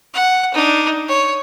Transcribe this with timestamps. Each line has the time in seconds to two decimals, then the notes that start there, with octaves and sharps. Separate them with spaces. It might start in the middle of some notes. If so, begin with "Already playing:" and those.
0.13 F#5
0.54 D4 D#4
1.08 C#5